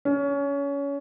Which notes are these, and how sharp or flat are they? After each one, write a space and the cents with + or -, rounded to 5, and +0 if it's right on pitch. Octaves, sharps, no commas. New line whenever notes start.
C#4 +25